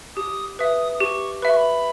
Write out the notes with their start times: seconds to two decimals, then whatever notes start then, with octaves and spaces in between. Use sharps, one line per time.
0.16 G4 D#6
0.59 B4 E5 D#6
0.94 D#6
1.01 G4 C#6
1.42 B4 E5 B5
1.50 C#6
1.57 B5